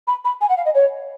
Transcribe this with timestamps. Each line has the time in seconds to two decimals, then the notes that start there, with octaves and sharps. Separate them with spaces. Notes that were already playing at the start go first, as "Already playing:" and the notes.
0.07 B5
0.24 B5
0.41 G#5
0.49 F#5
0.57 F5
0.65 D#5
0.74 C#5